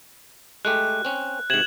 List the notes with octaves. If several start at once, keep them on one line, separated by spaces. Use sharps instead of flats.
G#3 A3 G4 F#6
C4 C#4
G#2 C3 G#6 E7 F#7